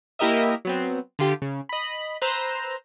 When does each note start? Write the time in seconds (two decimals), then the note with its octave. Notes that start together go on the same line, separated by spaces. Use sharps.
0.19 A#3 E4 G4 A#4 D#5 E5
0.65 F#3 B3 C4
1.19 D3 F4 G4
1.42 C#3
1.69 D#5 B5
2.22 B4 C5 A#5 E6